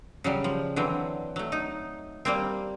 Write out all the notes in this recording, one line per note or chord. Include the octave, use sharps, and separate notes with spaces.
C#3 F#3 G3
F3
D3 E3 F#3 C4
F#3 A3
D#4
G3 A#3 C4